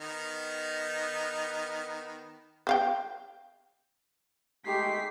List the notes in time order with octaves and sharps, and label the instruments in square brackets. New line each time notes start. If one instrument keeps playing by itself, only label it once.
[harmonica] D#3 B3 D#4
[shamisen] C4 F5 G5
[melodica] G#3 A3 D#4 [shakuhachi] G4 [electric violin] B6 C7